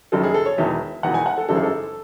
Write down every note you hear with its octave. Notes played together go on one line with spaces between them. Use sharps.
F#1 F#2 D#3 F#3 A4
G#4
A4
C#5
E1 E2 D#3 F#3 E5
E1 E2 D#3 F#3 F#5
G#5
F#5
A4
G#1 F#2 C#3 E3 A4
G#4
A4